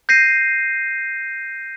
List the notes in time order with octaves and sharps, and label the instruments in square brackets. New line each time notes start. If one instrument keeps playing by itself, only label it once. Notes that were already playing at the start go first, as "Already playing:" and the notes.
[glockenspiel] G6 A#6 C7 D#7